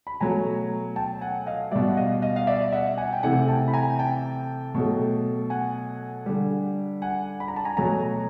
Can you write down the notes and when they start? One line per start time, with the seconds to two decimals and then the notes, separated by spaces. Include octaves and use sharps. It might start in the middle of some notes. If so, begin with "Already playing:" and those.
0.07 B5
0.20 B2 F#3 A3 G#5 A#5
0.96 G5 A5
1.21 F#5 G#5
1.46 D#5 F5
1.71 B2 G3 D5 E5
1.88 F#5
1.97 D#5 F5
2.22 D#5 F5
2.36 F5
2.47 D5 E5
2.72 E5 F#5
2.98 F#5 G#5
3.13 G5
3.23 C3 E3 A3 F#5 G#5
3.48 G5 A5
3.68 B5
3.73 G#5 A#5
3.99 G5 A5
4.74 B2 F#3 A3
5.50 F#5 G#5
6.26 D3 G3
7.02 F#5 G#5
7.40 B5
7.48 A#5
7.56 A5
7.65 G#5 A#5
7.77 B2 F#3 A3 G#5 A#5